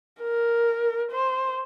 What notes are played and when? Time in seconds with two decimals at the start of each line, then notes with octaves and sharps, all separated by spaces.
0.21 A#4
1.11 C5